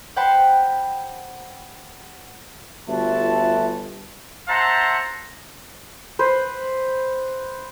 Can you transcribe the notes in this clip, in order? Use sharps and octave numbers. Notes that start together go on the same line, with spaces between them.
C5 F#5 G5 A5 B5 C6
G1 A3 F4 F#4 E5 A5
C5 E5 F#5 A5 A#5 C6
B4 C5